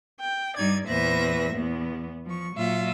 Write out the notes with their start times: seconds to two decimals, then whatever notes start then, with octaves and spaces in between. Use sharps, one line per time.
0.21 G5
0.57 G2 G3 D#4 D5 G#6
0.88 E2 A#2 B4 C5 E5 A#6
1.53 E2 B3
2.26 F3 C#6
2.54 A#2 F#3 F4 E5